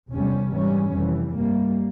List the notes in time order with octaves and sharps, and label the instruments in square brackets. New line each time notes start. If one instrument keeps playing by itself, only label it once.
[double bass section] F1 E2 C3 G3 C#4
G#2 E3 G3 C#4
F1 F2 E3 G3
G2 G3 A#3